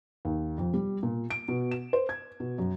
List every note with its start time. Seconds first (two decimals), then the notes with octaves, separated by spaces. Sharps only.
0.25 D#2
0.58 F2
0.74 G3
1.03 A#2
1.30 D7
1.48 B2
1.71 E7
1.93 C5
2.09 G#6
2.40 B2
2.58 F#2